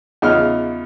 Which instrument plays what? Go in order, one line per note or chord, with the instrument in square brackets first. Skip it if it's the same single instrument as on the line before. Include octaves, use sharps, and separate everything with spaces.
[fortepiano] E2 C#3 D#4 F4 F6